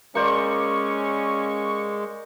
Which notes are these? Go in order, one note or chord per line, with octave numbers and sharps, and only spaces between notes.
G#3 A#3 C#4 C5 D5 C#6